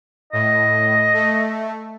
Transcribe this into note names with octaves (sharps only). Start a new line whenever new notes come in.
A2 D#5
A3